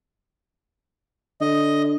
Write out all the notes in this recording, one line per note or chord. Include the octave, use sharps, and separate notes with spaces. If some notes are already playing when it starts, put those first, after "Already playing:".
D3 D#5